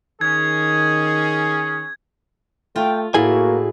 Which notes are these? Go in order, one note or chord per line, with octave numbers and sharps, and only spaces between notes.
D#3 C#4 G#4 G#6
A3 F4 G5
A2 A#3 E4 F#4 G#4 G#5